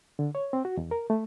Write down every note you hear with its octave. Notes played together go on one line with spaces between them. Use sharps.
D3
C#5
C4
F#4
E2
A#4
A3